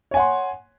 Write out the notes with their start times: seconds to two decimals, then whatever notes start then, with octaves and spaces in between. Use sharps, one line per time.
0.11 C#5
0.14 G#5
0.17 F#5
0.19 C6